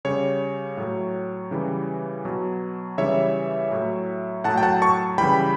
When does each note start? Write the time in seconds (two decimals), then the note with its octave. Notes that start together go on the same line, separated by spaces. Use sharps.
0.05 C#3 G3 C#5
0.77 A2 F#3
1.51 C#3 E3 G3
2.25 B2 F#3
2.98 C#3 E3 G3 C#5 E5
3.71 A2 F#3
4.44 A2 F#3 F#5 A5
4.58 G5
4.63 F#5 A5
4.82 A5 C#6
5.18 C#3 E3 G3 G5 B5